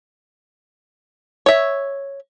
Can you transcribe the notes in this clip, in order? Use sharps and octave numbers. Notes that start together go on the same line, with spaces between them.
C#5 E5